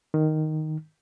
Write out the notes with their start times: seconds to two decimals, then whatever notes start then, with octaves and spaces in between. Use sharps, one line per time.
0.14 D#3